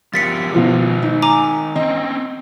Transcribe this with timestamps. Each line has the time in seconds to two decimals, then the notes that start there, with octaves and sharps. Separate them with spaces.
0.14 F3 G4 A#4 A6 B6 C#7
0.53 B2 D#3 F3 C5
1.02 D#4
1.22 G#5 A#5 D6
1.76 C4 C#4 D#5